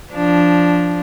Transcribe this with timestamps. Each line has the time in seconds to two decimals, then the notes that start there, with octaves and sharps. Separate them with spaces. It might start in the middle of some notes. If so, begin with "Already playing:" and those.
0.13 F3 D4